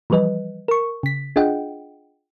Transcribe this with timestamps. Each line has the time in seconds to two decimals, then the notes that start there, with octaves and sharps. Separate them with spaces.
0.10 E3 F3 G3 B4 D#5
0.68 A#4 C#6
1.03 C#3 B6
1.36 D4 F4 G#4 D#5 F#5 G5